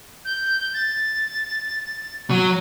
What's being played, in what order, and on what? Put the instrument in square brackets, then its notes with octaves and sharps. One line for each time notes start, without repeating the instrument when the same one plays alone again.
[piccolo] G6
A6
[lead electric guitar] F#3 [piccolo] D#7